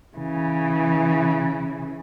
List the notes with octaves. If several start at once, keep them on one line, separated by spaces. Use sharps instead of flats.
C#3 E3